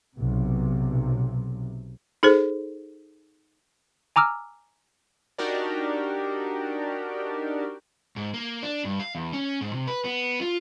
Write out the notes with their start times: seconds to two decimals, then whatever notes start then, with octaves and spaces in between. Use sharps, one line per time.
0.17 B1 C3
2.23 D#4 G#4 A4 C5
4.16 G#5 A#5 D6 E6 F6
5.38 D4 D#4 F#4 G4 A#4 D5
8.16 G#2
8.34 A#3
8.63 D4
8.84 G2
9.00 F5
9.15 E2
9.33 C#4
9.61 G#2
9.73 C3
9.87 B4
10.04 B3
10.41 F4